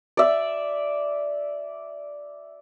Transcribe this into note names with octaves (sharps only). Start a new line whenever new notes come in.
D5 E5